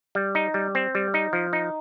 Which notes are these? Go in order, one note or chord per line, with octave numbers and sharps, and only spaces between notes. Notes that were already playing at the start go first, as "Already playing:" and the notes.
G3
D#4
G3
C4
G3
D#4
F3
D#4